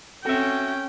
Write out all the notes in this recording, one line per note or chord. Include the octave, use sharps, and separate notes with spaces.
C4 C#4 F#4 A4 E5 G5